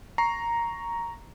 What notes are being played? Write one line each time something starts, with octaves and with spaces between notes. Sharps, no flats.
A#5 C#6 C7